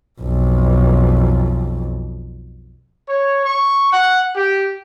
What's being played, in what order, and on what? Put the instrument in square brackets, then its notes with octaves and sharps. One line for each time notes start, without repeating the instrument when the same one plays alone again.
[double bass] B1 F2
[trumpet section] C#5
C#6
F#5
G4